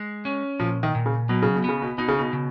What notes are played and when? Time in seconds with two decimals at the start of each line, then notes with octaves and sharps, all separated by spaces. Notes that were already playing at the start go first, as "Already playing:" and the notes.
Already playing: G#3
0.25 C#4
0.60 A#2 F3
0.83 D#3
0.95 A#2
1.06 C#3
1.29 B2 F#3
1.42 C#3
1.56 B2
1.64 C#3 B3
1.82 B2
1.98 B2 D#4
2.08 C#3
2.19 B2
2.33 C#3